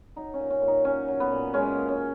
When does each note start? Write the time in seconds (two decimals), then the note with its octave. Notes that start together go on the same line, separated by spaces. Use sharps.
0.16 F#3 D#4
0.34 C#4
0.40 A#2
0.50 C#4
0.62 A#2
0.68 D#4
0.85 F#3 C#4
1.08 F#3
1.20 B3
1.32 A#2
1.54 G#3 C#4
1.78 A#2
1.88 C#4